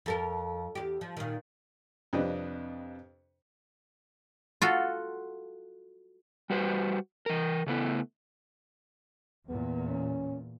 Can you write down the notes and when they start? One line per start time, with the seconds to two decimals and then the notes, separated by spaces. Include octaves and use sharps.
0.06 F2 A4 A#4
0.75 E2 G4
1.01 F3
1.17 A#2 D#3
2.13 F2 C3 G3 D4 B4 D#5
4.62 F4 F#4 A4
6.50 G3 F#4 B4 C5
7.26 E3 A#4
7.67 C#3 A3 B3 E4
9.49 E2 A#2 B3
9.88 C#4